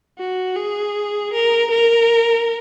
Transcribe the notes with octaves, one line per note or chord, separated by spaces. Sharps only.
F#4
G#4
A#4
A#4